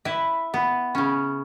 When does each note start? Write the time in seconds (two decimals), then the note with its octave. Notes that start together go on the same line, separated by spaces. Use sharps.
0.05 E4 B4
0.54 B3
0.95 C#3 C#4